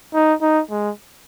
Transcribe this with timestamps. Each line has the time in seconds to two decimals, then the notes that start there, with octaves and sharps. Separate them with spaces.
0.14 D#4
0.42 D#4
0.71 G#3